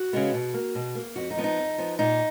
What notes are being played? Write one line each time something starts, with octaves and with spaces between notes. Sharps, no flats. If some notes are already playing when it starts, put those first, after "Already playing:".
Already playing: F#4
C#3 G#3 B3
B2
A#3
B2
A#3
F2 F#4
D#4
F3 B3
D#4
F2
F3 B3
A#2 D#4